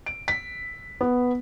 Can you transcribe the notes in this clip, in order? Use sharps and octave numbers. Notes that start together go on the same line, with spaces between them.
D7
B6
B3